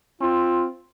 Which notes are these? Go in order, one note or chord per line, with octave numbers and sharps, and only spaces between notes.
C4 F4